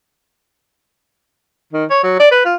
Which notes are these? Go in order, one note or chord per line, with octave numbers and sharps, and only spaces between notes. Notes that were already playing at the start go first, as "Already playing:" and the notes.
D#3
C#5
F#3
D5
B4
F4